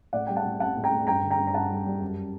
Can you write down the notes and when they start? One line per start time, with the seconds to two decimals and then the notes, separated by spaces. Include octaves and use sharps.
0.13 A2 D5 F#5
0.27 G3 G5
0.36 F#5 A5
0.45 A2
0.60 G3 F#5 A5
0.76 A2
0.84 G5 A#5
0.91 A2
1.07 G2 G5 A#5
1.23 D3
1.31 G5 A#5
1.38 G2
1.47 A#5
1.54 G2 F#5 A5
1.70 G3
1.86 G3
2.02 F#2